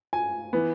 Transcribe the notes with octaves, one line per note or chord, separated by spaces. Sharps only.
G#5
E3 B3